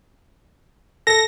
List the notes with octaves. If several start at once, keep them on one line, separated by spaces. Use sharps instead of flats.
A4 A#6